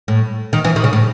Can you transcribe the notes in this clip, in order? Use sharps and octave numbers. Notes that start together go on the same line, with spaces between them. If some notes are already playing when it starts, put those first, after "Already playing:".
A2
D#3
E3
D#3
C#3
A2